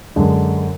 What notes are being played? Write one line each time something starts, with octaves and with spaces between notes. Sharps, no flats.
F#2 D3 G#3